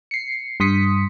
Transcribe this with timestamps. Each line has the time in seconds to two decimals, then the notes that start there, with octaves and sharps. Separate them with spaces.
0.11 C7 C#7
0.60 G2 C6 D#6 B6 C#7